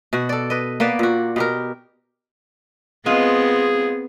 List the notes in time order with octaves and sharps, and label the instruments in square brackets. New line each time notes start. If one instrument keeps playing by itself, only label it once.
[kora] B2 F#4
A4 D5
B4 D#5
A#3 B3 B4 D5
A#2 F#4
B2 G4 A#4
[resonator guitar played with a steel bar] G#3 F4 [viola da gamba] B3 C4 [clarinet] G#4